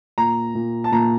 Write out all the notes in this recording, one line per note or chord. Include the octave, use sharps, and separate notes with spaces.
A#2 A#5
A#2
A5
A#2 A#5